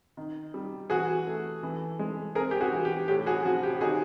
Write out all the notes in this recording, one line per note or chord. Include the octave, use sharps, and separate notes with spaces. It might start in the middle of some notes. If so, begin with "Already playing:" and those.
D#3
G3
E3 F#4 G#4
A3
E3
G#3
C4 G#4 A#4
G4
F#4 G#4
E3
G4
A2 G4
F#4 G#4
F3 F#4
G4
D#3 F#4 G#4